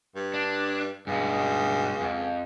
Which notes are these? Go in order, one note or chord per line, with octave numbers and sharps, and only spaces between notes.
G2
D4
C#2 G2 B2
F2